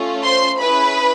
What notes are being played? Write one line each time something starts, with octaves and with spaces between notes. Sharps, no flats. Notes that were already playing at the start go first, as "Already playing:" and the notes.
Already playing: A3 C#4 F4
C5 C6
C#4 E4 G#4 B4 B5